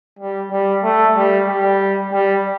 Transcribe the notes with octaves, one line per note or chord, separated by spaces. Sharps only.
G3
G3
A3
G3
G3
G3